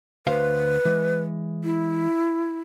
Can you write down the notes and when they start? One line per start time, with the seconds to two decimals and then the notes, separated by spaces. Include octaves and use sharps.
0.27 D2 B4 C5 F5
0.85 E3 G#3
1.64 E4